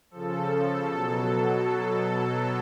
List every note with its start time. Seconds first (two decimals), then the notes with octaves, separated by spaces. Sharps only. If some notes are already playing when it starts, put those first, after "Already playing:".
0.11 C#3 F3 A4
0.88 B2 F#3